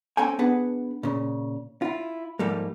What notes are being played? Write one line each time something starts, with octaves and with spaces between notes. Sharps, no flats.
A#3 C4 C#4 A4 G5 G#5
B3 D4 G#4 B4 F#5
A#2 C#3
E4 F4
G#2 F3 G3 A3 A#3